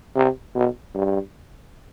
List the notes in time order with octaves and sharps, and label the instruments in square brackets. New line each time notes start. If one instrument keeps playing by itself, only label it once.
[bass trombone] C3
B2
G2